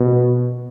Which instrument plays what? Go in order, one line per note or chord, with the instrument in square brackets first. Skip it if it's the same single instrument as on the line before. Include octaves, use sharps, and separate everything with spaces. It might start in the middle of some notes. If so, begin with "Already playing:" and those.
Already playing: [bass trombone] B2